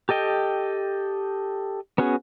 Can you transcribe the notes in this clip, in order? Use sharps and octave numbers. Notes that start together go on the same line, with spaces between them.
G4 A4 D#5 G5
B3 C#4 F#4 G#4